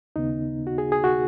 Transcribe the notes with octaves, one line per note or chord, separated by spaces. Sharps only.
D#2 C#3 B3 D#4
F#4
G#4
G#4
F#4